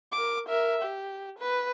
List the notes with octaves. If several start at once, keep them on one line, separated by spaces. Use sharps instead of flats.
A#4 D6
A#4 E5
G4
B4